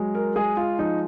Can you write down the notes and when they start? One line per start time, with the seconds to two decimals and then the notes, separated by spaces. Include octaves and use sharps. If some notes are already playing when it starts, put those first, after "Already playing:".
Already playing: F#3 G#3
0.15 A#4
0.36 G#3 G#4
0.57 F4
0.79 F3 D#4